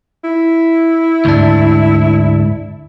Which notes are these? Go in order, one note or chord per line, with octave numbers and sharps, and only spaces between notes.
E4
D2 G#2 D4